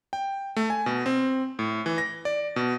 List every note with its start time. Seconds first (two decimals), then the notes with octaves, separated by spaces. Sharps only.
0.13 G5
0.56 A3
0.70 G#5
0.86 B2
1.06 C4
1.59 A2
1.86 E3
1.98 A#6
2.25 D5
2.56 B2